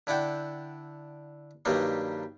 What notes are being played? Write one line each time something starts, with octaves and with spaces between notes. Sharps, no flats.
D3 E4 D5 F#5 G5
G2 D#3 F#3 G3 A#3